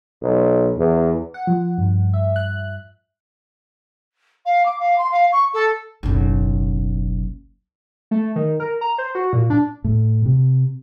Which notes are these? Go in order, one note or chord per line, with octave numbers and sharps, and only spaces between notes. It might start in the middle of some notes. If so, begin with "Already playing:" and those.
B1
E2
F#5
F3
G2
E5
F#6
F5
D6
F5
C6
F5
C#6
A4
F#1 B1
A3
D#3
A#4
A#5
C5
F#4
A#2
D4
A2
C3